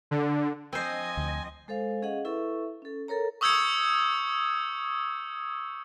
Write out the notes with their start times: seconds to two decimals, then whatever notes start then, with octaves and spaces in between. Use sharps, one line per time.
0.11 D3
0.73 F3 C4 C5 D#5 G#5
1.17 D2
1.68 G#3 A4 C5 F5
2.02 C#4 G#4 D#5 F5 F#5
2.25 E4 A4 B4 E5 C#6
2.82 C#4 A4
3.08 A4 A#4 C#5 A#5
3.41 C#6 D#6 E6 G6 G#6 C#7